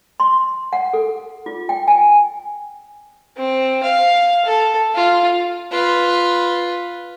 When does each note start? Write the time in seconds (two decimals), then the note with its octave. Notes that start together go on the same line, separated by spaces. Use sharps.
0.20 C6
0.73 F#5
0.93 A4
1.46 F4
1.69 G5
1.88 G#5
3.37 C4
3.83 F5
4.45 A4
4.95 F4
5.71 F4 B4